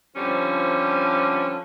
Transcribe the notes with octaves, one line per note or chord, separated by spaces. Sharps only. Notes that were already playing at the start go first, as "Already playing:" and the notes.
D3 F3 G3 C4 C#4